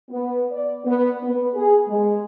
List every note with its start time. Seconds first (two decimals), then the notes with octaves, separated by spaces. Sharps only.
0.10 B3
0.51 D5
0.86 B3
1.23 B3
1.55 G#4
1.88 G#3